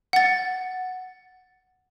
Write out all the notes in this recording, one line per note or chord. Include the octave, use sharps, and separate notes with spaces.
F#5 A6